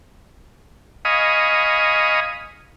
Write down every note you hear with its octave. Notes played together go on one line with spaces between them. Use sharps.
D#5 F5 G#5 B5 C#6 D#6